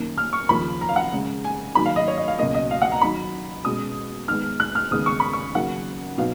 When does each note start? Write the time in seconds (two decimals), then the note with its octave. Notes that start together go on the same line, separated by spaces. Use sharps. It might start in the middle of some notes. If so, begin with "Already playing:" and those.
Already playing: F#2 D#3 A#3
0.18 F6
0.33 C#6
0.49 D#2 C#3 F3 A#3 B5
0.81 A#5
0.89 F5
0.96 F#5
1.12 C#3 G#3 C#4
1.44 G#5
1.75 G#2 D#3 F#3 A#3 D#4 B5
1.86 F5
1.96 D#5
2.08 C#5
2.17 D#5
2.28 F5
2.39 C#2 B2 F#3 A#3 D#5
2.54 D#5
2.71 F5
2.82 F#5
2.92 A#5
3.01 G#2 D#3 F#3 B5
3.65 B2 G#3 C#4 D#6
4.28 G#2 D#3 G#3 B3 F6
4.60 F#6
4.75 F6
4.91 D#2 C#3 G#3 B3 D#4 D#6
5.06 C#6
5.20 B5
5.33 C#6
5.55 C#3 F#3 A#3 D#4 F#5
6.18 B2 F#3 B3 D#4 F5